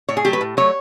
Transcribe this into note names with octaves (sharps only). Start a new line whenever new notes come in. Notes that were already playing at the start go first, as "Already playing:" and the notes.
A2 C#5
G#4
F#3 A3 G4
B4
A2
F#3 A3 C#5